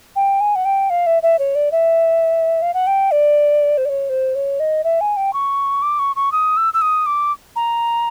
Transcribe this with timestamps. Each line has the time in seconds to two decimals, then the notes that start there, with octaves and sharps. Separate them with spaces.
0.16 G5
0.41 G#5
0.56 F#5
0.65 G5
0.90 F5
1.07 E5
1.23 E5
1.39 C#5
1.55 D5
1.72 E5
2.62 F5
2.74 F#5
2.87 G5
3.11 D5
3.78 C5
3.85 D5
3.89 C#5
4.10 C5
4.35 C#5
4.60 D#5
4.84 E5
5.01 G#5
5.17 G5
5.33 C#6
5.82 D6
5.99 C#6
6.16 C#6
6.32 D#6
6.57 E6
6.74 E6
6.82 D#6
7.06 D6
7.56 A#5